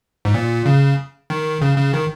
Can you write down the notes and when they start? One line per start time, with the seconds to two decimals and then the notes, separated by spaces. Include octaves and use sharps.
0.25 G#2
0.34 A#2
0.66 C#3
1.30 D#3
1.62 C#3
1.78 C#3
1.93 D#3